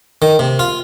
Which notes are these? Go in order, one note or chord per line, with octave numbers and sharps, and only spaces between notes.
D#3
C3
F4